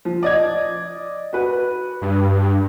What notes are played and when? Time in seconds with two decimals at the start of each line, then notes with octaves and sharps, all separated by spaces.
0.05 F3
0.23 D5 D#5 G#6
1.33 F#4 B4
2.02 G2